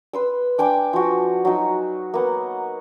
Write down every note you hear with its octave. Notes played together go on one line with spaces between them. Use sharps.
B4 C6 E6
D4 G5 G#5 D6
F3 F#4
F#3 D#4
A#3 B3 F#5